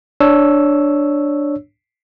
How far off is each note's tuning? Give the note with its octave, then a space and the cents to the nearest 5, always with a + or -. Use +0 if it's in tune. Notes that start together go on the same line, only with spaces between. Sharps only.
D4 +0 C#5 +0 E6 +0